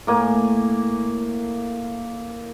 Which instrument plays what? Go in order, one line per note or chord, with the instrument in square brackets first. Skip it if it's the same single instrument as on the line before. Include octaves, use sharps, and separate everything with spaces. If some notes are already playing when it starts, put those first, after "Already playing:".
[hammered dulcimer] A2 A#3 G#5